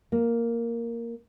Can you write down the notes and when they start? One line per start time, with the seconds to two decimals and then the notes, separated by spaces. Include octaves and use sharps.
0.12 A#3